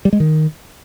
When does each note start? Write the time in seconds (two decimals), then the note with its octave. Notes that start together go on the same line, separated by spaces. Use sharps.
0.05 G3
0.13 G#3
0.20 D#3